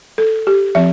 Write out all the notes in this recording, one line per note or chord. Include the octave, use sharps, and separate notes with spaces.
A4
G4
F3 C4 E5